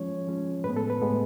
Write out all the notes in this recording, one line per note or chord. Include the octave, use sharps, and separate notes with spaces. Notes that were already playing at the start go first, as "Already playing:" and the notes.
Already playing: F3 G#3 C#4 C#5
F3 G#3 C#4
A2 G#3 B3 B4
A4
B4
A2 G#3 B3